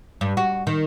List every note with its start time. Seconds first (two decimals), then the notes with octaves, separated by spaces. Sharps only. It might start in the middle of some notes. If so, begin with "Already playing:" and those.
0.21 G2
0.37 F#4
0.67 D#3